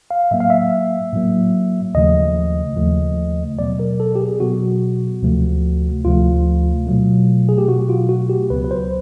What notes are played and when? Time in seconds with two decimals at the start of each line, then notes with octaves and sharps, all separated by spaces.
0.11 F5
0.31 A2 F#3 A#3 E5
0.40 F5
0.50 E5
1.13 A2 F#3 A#3
1.95 D#2 C#3 F3 A3 D#5
2.76 D#2 C#3 F3 A3
3.59 B2 F#3 B3 D5
3.79 A#4
4.00 A4
4.15 G4
4.20 G#4
4.40 B2 F#3 B3 F#4
5.22 D2 C3 F3 A3
6.05 D2 C3 F3 A3 F4
6.87 B2 F#3 A3
7.49 G#4
7.58 G4
7.68 B2 F#3 A3 F#4
7.89 F4
8.09 F#4
8.30 G4
8.50 C#2 C#3 F#3 B3 B4
8.64 B4
8.71 C5